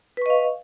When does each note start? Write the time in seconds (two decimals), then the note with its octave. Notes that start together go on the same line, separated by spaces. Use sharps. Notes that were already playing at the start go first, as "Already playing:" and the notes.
0.17 B4
0.22 C#6
0.26 D#5
0.30 F5